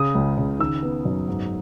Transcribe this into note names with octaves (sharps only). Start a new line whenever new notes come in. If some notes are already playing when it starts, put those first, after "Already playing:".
Already playing: C#3 D#6
C#2
C#3
D#3 E6
B3
F#2
G#2